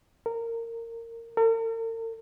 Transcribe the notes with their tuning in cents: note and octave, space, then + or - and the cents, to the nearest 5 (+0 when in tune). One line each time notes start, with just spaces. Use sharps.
A#4 -20
A#4 -45